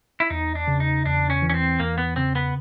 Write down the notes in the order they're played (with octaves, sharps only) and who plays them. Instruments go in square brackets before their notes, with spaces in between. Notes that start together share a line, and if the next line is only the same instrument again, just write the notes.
[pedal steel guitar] E4
[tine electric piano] E2 [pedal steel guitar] D#4
[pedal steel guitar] D4
[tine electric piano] C#3
[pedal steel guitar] D#4
[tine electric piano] E2 [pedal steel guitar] D4
[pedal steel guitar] C#4
[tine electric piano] E3
[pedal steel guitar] C#4
C4
[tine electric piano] E2 [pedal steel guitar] A#3
[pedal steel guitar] B3
[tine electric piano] C#3 [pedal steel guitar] C4
[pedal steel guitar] B3